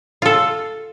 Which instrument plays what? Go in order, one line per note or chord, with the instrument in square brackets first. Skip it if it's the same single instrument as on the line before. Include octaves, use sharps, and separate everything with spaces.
[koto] F4 A4